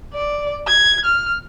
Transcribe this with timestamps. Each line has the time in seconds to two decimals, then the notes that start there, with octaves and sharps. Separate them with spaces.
0.14 D5
0.68 G#6
1.05 F6